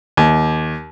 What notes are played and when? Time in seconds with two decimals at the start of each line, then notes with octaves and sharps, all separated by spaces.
0.17 D#2